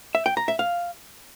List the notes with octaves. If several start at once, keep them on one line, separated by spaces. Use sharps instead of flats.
E5
G5
A#5
E5
F5